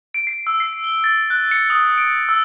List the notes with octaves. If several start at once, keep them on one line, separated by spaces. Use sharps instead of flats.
D7
C7
E6
C7
G7
A6
F#6
C#7
D#6
D7
E6